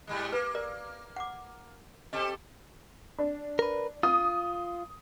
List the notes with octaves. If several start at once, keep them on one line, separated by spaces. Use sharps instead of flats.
G#2 G3 G#3
A#3 B4
A#4 D5
F#5 D6
C4 G4 A4 D#5
D4
A#4 B4
F4 D#6